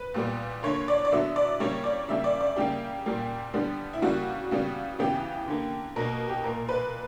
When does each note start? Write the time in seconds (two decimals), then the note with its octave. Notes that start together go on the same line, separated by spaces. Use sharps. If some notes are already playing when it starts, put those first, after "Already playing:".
Already playing: B4
0.14 A#2 G3 B3
0.63 D3 A#3 C#5
0.88 D5
1.05 D5
1.12 D3 F#3 B3 E5
1.36 D5
1.60 C#3 G3 A#3 C#5
1.84 D5
2.09 C#3 G3 A#3 E5
2.24 D5
2.41 D5
2.56 C#3 G3 A#3 G4
3.06 A#2 G3 A#3
3.54 D3 G3 B3
3.93 E4
4.02 C#3 G3 A#3 F#4
4.51 C#3 G3 B3
4.99 C#3 E3 B3 G4
5.48 D3 A#3
5.96 B2 A#3 A#4
6.28 G4
6.44 A#2 A#3 A#4
6.69 B4